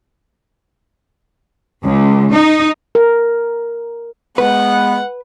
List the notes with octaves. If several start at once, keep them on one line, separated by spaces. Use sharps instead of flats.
C#2
D#4
A#4
G#3 B3 B4 F#5